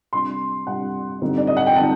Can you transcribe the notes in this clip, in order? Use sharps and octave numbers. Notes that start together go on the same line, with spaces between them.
C3 G3 D4 C6
C3 G3 D4 F#5
D3 G3 C4 D#4
D5
D#5
F#5
G5
D3 G3 C4 D#4 A5